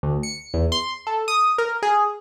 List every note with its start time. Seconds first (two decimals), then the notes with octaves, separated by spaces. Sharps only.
0.03 D2
0.23 C#7
0.54 E2
0.72 C6
1.07 A4
1.28 D#6
1.58 A#4
1.83 G#4